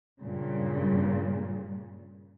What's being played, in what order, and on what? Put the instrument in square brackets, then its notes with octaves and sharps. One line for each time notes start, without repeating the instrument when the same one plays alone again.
[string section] G2 A#2 C#3